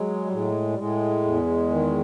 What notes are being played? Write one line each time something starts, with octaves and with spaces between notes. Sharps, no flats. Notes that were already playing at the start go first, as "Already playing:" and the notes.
Already playing: F#3 G#3
G3
A2 G#3
G3
A2 G#3
E2
D#3